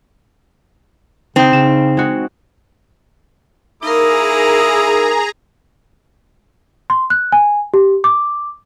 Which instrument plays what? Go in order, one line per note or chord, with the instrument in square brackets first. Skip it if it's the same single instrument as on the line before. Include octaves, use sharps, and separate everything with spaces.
[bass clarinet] C#3 [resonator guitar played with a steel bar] C4 [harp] D#4 G5
[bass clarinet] C#3 [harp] E7
[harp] G#3 F#4
[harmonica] A#3 E4 D#6 [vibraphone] D#4 A#4 [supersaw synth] G#4 A#5
[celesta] C6
F#6
G#5
G4
D6